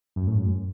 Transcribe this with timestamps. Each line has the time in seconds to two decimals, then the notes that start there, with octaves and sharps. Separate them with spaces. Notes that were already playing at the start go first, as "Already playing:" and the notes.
0.16 F#2
0.27 A2
0.39 F#2